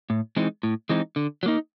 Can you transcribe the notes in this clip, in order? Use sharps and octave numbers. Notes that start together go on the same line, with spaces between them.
A2
E3 G#3 C4 D#4
A2
E3 G#3 C4 D#4
D3
F#3
A#3 D#4